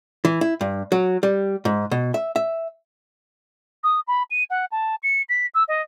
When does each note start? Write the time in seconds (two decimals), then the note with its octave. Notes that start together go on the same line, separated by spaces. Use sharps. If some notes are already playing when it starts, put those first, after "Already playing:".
0.25 E3
0.41 E4
0.61 G2
0.92 F#3
1.23 G3
1.65 G#2
1.91 B2
2.14 E5
2.36 E5
3.84 D#6
4.08 B5
4.31 D#7
4.50 F#5
4.72 A5
5.03 C#7
5.29 B6
5.55 E6
5.68 D#5